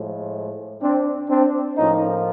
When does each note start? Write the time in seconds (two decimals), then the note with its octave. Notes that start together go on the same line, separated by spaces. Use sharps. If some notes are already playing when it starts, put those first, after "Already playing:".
Already playing: A2 F3 G#3
0.81 C4 D4
1.29 C4 D4
1.76 A2 F3 A#3 C#4 D#4